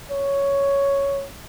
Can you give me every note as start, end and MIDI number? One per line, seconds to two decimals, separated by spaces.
0.11 1.25 73